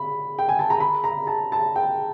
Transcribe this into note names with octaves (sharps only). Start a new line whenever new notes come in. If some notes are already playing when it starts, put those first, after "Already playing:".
Already playing: B5
G5
G#5
A5
A#5
B5
A#5
A5
A5
G5